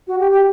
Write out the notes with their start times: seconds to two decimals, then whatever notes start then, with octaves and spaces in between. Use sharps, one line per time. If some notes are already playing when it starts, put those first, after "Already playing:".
0.08 F#4
0.20 G4
0.31 G4